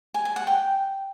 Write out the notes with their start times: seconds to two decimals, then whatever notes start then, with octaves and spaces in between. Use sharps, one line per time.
0.14 G#5
0.25 G#5
0.36 F#5
0.47 G5